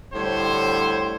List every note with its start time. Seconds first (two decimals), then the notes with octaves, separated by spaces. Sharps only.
0.13 A2 D3 G3 C4 C5 C#5